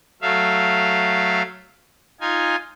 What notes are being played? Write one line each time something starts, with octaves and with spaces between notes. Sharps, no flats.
F#3 A3 E5 F5
D#4 F4 G#5